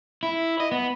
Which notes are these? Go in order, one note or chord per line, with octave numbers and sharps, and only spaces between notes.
E4
D#5
B3